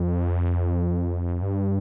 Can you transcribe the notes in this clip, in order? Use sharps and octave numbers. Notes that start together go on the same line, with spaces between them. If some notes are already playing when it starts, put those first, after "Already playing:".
Already playing: F2
G2